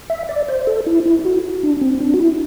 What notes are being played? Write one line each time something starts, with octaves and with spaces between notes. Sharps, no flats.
E5
D5
C5
A4
E4
E4
F#4
D4
C4
D4
F#4
E4